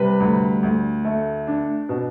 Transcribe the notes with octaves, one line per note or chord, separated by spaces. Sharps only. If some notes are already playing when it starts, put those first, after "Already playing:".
Already playing: C3 G3 B4
D2
D2
A3
D4
B2